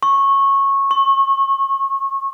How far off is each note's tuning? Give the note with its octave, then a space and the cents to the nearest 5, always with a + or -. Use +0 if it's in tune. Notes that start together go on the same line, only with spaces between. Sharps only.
C#6 -15
C#6 -30